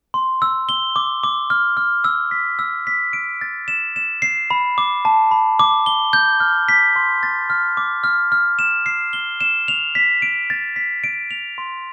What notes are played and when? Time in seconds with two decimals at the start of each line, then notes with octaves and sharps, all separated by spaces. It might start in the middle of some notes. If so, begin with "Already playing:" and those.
0.14 C6
0.42 E6
0.69 G7
0.96 D6
1.23 D6
1.50 F6
1.77 F6
2.04 E6
2.31 B6
2.59 E6
2.87 B6
3.13 D7
3.41 A6
3.68 E7
3.96 E7
4.22 C7
4.51 B5
4.78 D6
5.05 A5
5.31 B5
5.60 D6
5.86 G7
6.13 G6
6.40 F6
6.69 B6
6.96 C6
7.23 A6
7.50 F6
7.77 D6
8.04 F6
8.32 F6
8.59 E7
8.86 C7
9.13 G7
9.41 E7
9.68 F7
9.95 B6
10.22 D7
10.50 A6
10.76 B6
11.04 D7
11.31 F7
11.58 C6